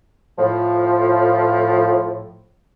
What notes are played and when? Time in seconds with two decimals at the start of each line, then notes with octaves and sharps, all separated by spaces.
0.39 A2 F3